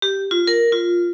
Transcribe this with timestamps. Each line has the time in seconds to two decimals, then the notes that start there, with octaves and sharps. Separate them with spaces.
0.02 G4
0.31 F4
0.47 A#4
0.72 F4